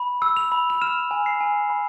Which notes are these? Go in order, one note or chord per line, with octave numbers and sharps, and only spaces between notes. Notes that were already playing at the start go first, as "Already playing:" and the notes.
Already playing: B5
E6
F7
B5
F7
F6 E7
G#5
C7
G#5
B5